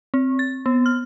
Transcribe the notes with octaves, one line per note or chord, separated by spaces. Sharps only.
C4
A6
B3
F6